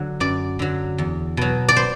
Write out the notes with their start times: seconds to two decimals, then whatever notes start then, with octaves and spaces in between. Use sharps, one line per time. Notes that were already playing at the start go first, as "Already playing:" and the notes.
Already playing: D3 F#3
0.20 F#2 D5
0.59 D3 F#3
0.98 E2
1.37 B2 F#3
1.68 D5
1.76 C5